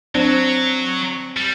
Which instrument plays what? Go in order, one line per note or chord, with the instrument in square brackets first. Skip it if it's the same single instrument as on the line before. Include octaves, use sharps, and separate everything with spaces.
[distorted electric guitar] F#3 [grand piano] C4 D4
[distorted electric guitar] G3